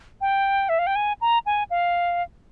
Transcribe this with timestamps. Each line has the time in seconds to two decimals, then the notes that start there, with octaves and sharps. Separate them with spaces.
0.21 G5
0.69 E5
0.79 F5
0.87 G5
0.96 G#5
1.21 A#5
1.46 G#5
1.70 F5